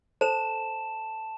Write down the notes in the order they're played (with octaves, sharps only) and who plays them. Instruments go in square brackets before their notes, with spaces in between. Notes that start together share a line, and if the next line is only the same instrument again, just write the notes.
[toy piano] A4 C5 [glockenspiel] A5 E7